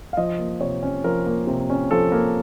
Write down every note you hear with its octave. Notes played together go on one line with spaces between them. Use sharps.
F5
F3 D#5
A#3
C3 C#5
C#4
F3 A#4
A#3
C3
C#4
F3 A4
A#3